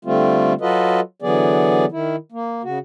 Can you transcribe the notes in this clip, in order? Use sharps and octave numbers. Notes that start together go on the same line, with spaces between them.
D3 G3 A3 C4 F4
F#3 F4 F#4 A4 B4 D#5
D3 E3 F#3 B3 G#4 D5
D#3 E4
A#3
C#3 F#4